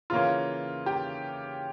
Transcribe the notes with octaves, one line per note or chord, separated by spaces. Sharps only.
C#3 E3 A#3 C#4 F4
G4